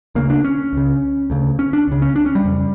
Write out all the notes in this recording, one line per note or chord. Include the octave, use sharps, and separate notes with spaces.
D2 C#3 A#3
D4
C#4
C#2 C#3
D2 C#3
C#4
D4
C#2 C#3
C#4
D4
C#4
G3
F2 C#3